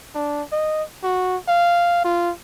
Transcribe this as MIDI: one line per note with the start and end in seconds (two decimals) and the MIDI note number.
0.15 0.43 62
0.52 0.83 75
1.03 1.37 66
1.48 2.01 77
2.05 2.32 65